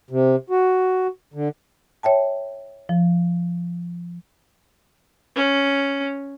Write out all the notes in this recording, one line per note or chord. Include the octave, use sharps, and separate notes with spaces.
C3
F#4
D3
C#5 E5 G5 A5
F3
C#4